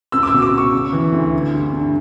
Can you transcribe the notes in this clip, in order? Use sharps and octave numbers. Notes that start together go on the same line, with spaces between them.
C#2 E6
D6
E6
B2
D6
C#2
C#6
C#3
E3
D2
D3
G2
G2